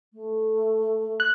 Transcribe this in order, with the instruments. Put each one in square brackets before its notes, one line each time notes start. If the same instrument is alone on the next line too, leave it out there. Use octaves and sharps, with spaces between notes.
[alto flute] A3
[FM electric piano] F#6